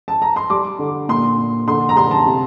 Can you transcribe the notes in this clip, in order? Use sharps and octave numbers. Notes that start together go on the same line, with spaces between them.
A5
A#5
C6
G3 D6
D3
A#2 C6
A#2
D3 C6
A#5
G3 C6
A5
C3